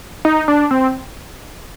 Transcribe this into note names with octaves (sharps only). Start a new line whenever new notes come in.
D#4
D4
C4